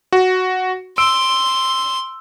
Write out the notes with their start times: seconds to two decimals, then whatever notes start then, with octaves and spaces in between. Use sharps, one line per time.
0.13 F#4
0.98 C6 E6 D7